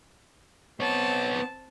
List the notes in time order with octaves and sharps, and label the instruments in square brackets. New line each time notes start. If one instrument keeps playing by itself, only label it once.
[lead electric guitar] B3 C#5 [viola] C4 A5